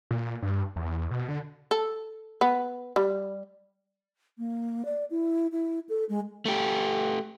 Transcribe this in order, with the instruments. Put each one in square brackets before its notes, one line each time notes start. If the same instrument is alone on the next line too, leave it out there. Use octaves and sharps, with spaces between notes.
[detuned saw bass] A#2
G2
E2
B2
D3
[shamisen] A4
B3
G3
[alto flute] A#3
D5
E4
E4
A4
G#3
[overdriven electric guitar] A3 G4